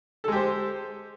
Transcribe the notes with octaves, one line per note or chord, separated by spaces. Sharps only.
G#3 G4 A4 C5